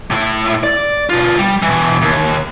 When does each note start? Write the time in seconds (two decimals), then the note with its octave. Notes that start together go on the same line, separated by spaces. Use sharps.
0.11 A2 E4
0.64 D5
1.09 B2 F4
1.39 G3
1.62 B2 E3
2.02 D#2